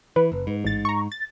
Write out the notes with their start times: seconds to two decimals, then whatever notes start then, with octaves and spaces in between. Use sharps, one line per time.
0.16 E3 B4
0.32 F#1
0.47 G#2
0.64 A1 A6
0.85 A#5 C#6
1.12 A6